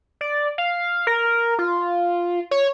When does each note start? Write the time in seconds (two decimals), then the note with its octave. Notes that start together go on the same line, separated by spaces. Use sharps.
0.21 D5
0.58 F5
1.07 A#4
1.59 F4
2.51 C#5